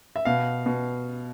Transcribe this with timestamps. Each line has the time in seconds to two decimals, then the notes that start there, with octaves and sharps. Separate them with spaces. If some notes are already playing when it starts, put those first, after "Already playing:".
0.16 E5
0.25 B2 F5
0.66 B2